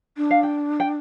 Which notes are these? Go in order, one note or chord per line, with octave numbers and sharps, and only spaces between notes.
D4
F5
G5
G5